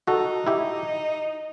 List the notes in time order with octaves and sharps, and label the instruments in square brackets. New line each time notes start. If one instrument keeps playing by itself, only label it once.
[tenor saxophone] D#4 [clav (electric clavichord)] F#4 A4
[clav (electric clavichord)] E4 G4